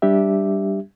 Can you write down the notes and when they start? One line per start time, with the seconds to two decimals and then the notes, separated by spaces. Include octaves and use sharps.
0.02 G3 D4 G4 E5